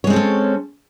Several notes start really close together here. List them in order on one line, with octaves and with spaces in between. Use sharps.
C#5 G#3 C4 A4 C#4